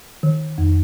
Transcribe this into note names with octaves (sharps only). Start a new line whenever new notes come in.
D#3
F2